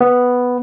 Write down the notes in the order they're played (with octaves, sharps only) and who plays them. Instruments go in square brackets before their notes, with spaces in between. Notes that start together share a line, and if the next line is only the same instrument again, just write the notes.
[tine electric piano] B3